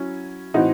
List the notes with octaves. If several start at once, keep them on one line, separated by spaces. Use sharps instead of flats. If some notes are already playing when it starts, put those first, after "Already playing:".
Already playing: F#3 C#4 E4
A2 E3 C4 D#4 F#4